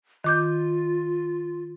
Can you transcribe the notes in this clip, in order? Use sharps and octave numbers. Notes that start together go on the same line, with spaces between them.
D#3 F4 D6 G6